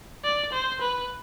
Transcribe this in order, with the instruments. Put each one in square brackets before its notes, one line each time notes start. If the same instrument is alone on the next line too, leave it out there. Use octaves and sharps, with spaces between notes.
[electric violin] D5
C5
B4